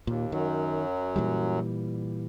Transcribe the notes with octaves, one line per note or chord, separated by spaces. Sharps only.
D#2 A#2
F#2 D#3 F#3
A#2 E3 G3